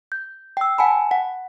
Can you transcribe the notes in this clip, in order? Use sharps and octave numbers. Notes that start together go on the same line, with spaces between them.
G6
G5 E6
F#5 G#5 A5 B5
F#5